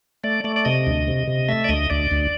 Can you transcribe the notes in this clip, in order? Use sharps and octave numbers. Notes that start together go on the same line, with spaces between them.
A3 D5
A3 D5
D5
C3 D#5
D2
C3
C3
A3 E5
D5
D2 D#5
D2 D5
D2